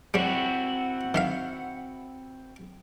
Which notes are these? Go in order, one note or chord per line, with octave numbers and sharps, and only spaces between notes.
G3 C4 E4 F#4 C#5 F#5
D#3 E5 F5